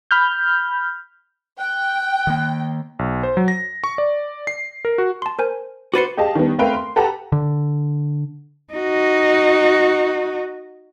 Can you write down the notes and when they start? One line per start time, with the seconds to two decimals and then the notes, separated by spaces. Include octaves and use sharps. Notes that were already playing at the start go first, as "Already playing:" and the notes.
0.11 B5 F6 G6
1.59 G5 F#6
2.27 D#3 A#3
2.99 B1
3.23 C5
3.37 F#3
3.48 A#6
3.84 C#6
3.98 D5
4.47 C7
4.85 A#4
4.98 F#4
5.22 A5 C6
5.39 A#4 C5 G#5
5.94 F#4 B4 C5 D6 A6 C#7
6.17 G4 G#4 D#5 F5 A5
6.35 D#3 G3 B3
6.58 A3 C4 A#4 B4 F5 G5
6.74 C6
6.96 G4 A4 B4 F#5 A5 A#5
7.32 D3
8.74 D#4 F#4